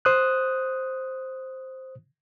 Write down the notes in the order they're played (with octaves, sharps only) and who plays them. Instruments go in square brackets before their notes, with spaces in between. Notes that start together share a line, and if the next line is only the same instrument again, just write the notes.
[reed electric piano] C5 D#6 F#6